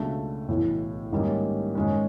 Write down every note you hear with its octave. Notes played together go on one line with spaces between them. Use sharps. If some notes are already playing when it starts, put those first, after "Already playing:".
Already playing: C#2 B2 F#3 A3 D4
B1 A2 E3
G#2 D#3 G3 A#3 C#4
G#2 D#3 G#3 C#4